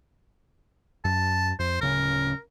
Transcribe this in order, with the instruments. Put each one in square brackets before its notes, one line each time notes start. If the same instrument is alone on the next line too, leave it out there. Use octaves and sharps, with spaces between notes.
[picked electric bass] F#2 [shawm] A5
[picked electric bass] F2 [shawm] C5
[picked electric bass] D1 C#3 C#4 [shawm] A#4